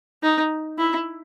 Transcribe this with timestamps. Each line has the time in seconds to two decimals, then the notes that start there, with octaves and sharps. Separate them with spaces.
0.23 D#4
0.78 E4